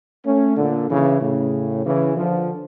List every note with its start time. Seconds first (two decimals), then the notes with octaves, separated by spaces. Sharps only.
0.24 A3 C#4
0.56 A#2 D3
0.88 C#3 E3
1.20 A2 C#3
1.84 C#3 E3
2.16 D3 F3